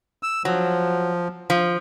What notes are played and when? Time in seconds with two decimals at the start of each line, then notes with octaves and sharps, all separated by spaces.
0.23 E6
0.45 F3 F#3
1.50 F3